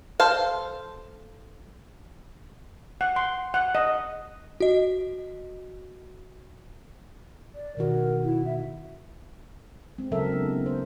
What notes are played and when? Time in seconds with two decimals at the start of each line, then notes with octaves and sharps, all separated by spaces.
0.20 A4 C5 F5
3.01 F#5
3.16 C6
3.54 F#5
3.75 D#5
4.60 F#4 D#5
7.55 D5
7.77 B2 D#3 F#4 A#4
8.24 E4
8.46 E5
9.98 G#3 C4
10.11 C#3 F#3 A4 A#4 E5
10.32 F#3 B3 D#4
10.66 C5